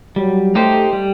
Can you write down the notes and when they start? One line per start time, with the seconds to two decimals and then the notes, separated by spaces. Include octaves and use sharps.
0.16 F#3 G3
0.54 A3 D#4 G4 C5
0.93 G3